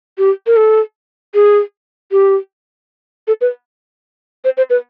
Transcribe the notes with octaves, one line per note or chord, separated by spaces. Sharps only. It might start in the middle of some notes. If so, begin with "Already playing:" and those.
G4
A#4
A4
G#4
G4
A4
B4
C5
C5
B4